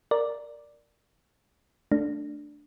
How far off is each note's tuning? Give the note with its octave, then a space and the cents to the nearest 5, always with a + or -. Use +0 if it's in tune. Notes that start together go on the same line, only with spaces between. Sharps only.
A#4 +0 D5 +0
A3 +5 D4 +0